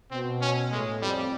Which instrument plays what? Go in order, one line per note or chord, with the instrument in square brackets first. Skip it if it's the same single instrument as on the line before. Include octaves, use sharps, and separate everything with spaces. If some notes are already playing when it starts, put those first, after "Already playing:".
[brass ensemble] B2 [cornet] C4
[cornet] C#4
[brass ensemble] A2 [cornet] G#3
[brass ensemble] F2 [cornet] G3